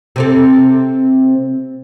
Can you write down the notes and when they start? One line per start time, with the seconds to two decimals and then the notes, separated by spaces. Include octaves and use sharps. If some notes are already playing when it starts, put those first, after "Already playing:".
0.16 C3 C4 A4